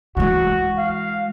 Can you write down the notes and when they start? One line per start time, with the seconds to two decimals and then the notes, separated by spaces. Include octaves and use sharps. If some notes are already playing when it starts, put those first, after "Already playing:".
0.17 E3 G#3 F#4
0.78 F5